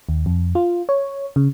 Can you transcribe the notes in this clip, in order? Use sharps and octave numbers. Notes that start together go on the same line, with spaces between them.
D#2
F2
F4
C#5
C#3